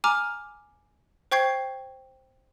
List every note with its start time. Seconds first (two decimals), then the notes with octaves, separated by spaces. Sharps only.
0.04 G#5 A#5 D6 F6
1.31 C5 G5 C#6 G6 G#6 C7